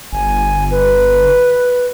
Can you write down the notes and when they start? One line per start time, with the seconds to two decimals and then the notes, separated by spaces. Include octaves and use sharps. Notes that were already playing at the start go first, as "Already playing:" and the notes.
0.12 G1 G#5
0.71 B4